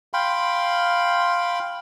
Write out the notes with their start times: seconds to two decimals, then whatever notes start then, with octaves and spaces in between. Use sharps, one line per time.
0.14 F5 G5 B5 C6